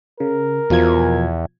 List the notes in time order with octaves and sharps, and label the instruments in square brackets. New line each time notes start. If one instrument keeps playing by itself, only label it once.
[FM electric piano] C#3 [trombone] A#4
[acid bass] E2 [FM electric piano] B2 F3 G#6